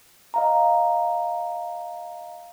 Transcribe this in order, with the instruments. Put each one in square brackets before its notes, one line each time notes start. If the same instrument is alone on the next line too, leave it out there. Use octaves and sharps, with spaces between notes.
[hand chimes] D#5 F5 A#5